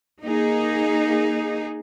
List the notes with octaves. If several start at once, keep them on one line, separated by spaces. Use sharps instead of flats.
A#3 D#4 G#4